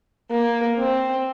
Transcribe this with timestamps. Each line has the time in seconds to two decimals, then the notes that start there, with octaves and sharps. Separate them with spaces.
0.30 A#3
0.79 C4